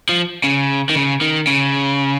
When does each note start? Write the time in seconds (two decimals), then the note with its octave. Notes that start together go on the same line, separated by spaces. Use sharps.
0.09 F3
0.44 C#3
0.89 D#3
0.95 C#3
1.21 D#3
1.47 C#3